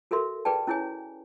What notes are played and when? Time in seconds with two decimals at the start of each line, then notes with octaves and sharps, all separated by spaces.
0.11 F#4 A4 A#4 E5 C6
0.45 G#4 B4 D5 G5 A5
0.67 C#4 E4 G#4 C#5 G#5